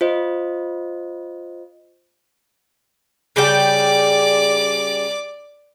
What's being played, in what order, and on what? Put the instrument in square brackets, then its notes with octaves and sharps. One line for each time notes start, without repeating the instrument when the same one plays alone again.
[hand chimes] F4 C5 D#5
[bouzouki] C#3 G3 G5 [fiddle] D5 D6